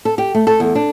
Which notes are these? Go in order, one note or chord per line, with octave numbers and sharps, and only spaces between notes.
A4
G4
A3
A4
E2
D4